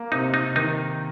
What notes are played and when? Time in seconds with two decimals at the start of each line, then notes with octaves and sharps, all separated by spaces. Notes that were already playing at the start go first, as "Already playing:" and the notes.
Already playing: A#3
0.12 C3 D#4
0.34 D#4
0.56 D#3 D#4